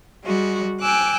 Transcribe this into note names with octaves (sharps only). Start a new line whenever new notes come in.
G3 G#3 F#4
G5 G#5 D6 E6 F#6